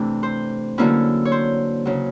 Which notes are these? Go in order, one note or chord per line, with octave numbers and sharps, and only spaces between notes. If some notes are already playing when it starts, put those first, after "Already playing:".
Already playing: C3 E3 A3 D4
C5
D3 F#3 A#3 C#4 E4
C#5
C5
C#3 F#3